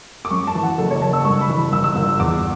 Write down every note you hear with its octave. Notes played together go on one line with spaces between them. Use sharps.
D6
F#2 C#6
A5
E3
F#5
F#1 A4
C#5
F#1 A5
E6
G2 C#6
B5
E3
B5
G1 E6
E6
G1
E2 D6